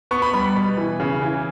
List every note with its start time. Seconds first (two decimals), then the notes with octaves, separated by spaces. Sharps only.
0.11 B3 C#6
0.22 B5
0.34 G3 B5
0.56 B2
0.77 E3
1.00 C#3
1.22 E3